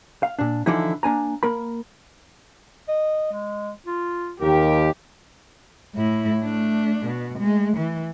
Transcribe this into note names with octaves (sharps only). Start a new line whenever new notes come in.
F5
A#2 D4
D3 E3 F3 D#4 E4
A#3 D4 G#5 A#5
A#3 A#4 B5
D#5
G#3
F4
D#2 G4 A#4
A2 E4
A3 D4
B2
G#3 A3
E3